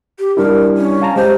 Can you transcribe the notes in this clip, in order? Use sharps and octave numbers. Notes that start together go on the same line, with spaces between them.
G4
G3 D4 E4 A#4
C#4
F5 A5 A#5
G#3 G4 C5